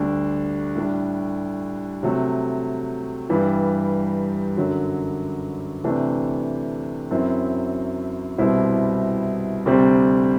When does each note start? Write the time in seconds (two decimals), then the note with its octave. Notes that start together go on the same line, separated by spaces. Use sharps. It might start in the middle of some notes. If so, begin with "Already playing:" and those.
Already playing: D2 D3 G3 D4
0.75 A2 G3 D4
2.03 C3 F#3 A3
3.30 G2 E3 G3
4.57 F#2 D3 F#3
5.84 C3 E3 A3 D4
7.11 F#2 F#3 C4 E4
8.38 C2 B2 G3 C4 E4
9.66 D2 C3 G3 C4